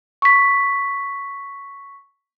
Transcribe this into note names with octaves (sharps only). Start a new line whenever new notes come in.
C#6 B6